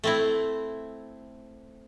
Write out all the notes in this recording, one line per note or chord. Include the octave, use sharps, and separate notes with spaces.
A3 C4 E4